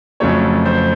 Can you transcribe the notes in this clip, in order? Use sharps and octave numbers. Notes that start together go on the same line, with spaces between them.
F2 C#3 F#3 A3 C#5
C5